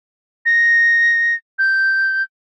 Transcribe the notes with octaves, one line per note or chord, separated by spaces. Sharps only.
A#6
G6